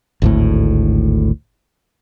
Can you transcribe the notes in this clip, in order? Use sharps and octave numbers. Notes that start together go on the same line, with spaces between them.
G#1 D2 A2